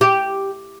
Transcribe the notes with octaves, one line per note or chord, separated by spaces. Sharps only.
G4